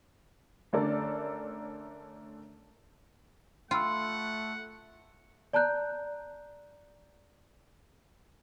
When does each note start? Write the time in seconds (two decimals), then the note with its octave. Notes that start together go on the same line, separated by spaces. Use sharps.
0.73 D3 A3 C#4 A4 A#4 D5
3.71 A3 F4 F#5 G5 B5 E6
5.53 D5 A5 A#5 F#6 G6